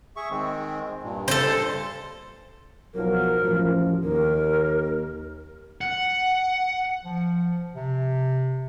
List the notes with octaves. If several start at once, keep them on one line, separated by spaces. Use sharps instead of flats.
G#4 E5 C#6
D#3 G#3 C4
G2 A#2
A4 C5
B1 F3 F#3 A#4
A1 F#2 F3
D#2 A#4
F#5
F3
C3